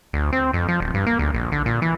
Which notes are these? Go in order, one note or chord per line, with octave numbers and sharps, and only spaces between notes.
D2
C4
F2
F3
D1
G2
A#3
D2
A#1
D3
A#2
E3